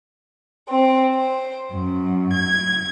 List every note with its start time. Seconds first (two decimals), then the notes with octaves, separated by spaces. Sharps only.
0.69 C4
1.15 C5
1.72 F#2
2.34 G#6